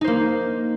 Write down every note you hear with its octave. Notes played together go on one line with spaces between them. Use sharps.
A#3 D#4 C5